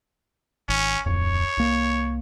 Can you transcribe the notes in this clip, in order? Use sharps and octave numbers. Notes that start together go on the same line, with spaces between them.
G#1 C#4
D1 F2 C#5
C2 A#3